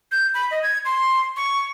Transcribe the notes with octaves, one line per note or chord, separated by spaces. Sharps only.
G6
B5
D#5
G#6
C6
C#6